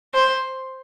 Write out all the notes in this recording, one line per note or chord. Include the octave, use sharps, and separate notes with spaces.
C5